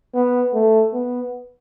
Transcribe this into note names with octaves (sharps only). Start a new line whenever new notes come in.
B3
A3
B3